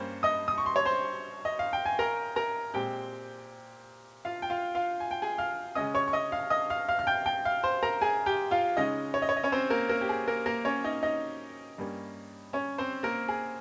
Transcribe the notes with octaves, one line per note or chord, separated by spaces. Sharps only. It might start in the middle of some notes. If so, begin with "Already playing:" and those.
Already playing: G2 G3 A#3 C#4 C5
D#5 D#6
D#6
C#6
C6
C#5 C#6
C5 C6
D#5
F5
G5
G#5
A#4 A#5
A#4 A#5
A#2 G#3 C4 G4 G5
F4 F5
G5
F4 F5
F4 F5
G#5
G5
G#4 G#5
F5 F6
C#3 G#3 C#4 D#5 D#6
C#5 C#6
C#6
D#5 D#6
F5 F6
D#5 D#6
F5 F6
F5 F6
F6
G5 G6
G5 G6
F5 F6
C5 C6
A#4 A#5
G#4 G#5
G4 G5
F4 F5
C#3 G#3 C#4 D#4 D#5
C#5
D#5
C#5
D#5
C#4 C#5
C4 C5
A#3 A#4
A#3 A#4
G4
G#4
A#3 A#4
A#3 A#4
C#4 C#5
D#4 D#5
D#4 D#5
G2 G3 A#3 C#4
C#4 C#5
C4 C5
A#3 A#4
G#4